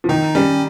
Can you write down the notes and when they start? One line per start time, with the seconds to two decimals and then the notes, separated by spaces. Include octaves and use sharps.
0.04 F3
0.09 D#3 D#4
0.35 G3 C#4